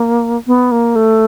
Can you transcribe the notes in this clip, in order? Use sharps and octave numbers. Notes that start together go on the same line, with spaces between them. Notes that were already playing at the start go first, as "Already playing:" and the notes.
Already playing: A#3
B3
A#3
A3